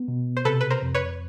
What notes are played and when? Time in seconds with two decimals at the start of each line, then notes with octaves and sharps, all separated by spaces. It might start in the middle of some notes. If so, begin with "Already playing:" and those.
Already playing: B3
0.08 B2
0.37 C5
0.45 C3 A4 B4
0.61 B4
0.70 A#4 C5
0.82 F2
0.95 B4 C#5